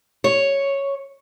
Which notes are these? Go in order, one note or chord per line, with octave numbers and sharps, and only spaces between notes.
C#5